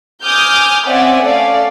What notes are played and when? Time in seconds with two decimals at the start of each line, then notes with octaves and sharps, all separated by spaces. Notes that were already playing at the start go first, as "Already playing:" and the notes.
0.23 G#5 D6 D#6 F6 G6
0.87 C4 C#4 D5 E5 F#5 G#5
1.23 A3 C#4 D5 F5